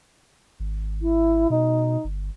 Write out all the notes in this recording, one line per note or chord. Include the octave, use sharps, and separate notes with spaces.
G#1
E4
B2 D#4
G1